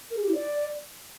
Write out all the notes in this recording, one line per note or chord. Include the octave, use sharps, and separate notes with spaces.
A#4
G#4
G4
E4
D5